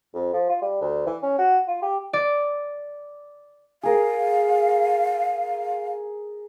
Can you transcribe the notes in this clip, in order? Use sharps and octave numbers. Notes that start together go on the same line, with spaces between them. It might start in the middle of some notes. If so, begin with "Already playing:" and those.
F2
F3
F4
G3
D2
E3
C#4
F#4
F4
G4
D5
G#4 A#4 F5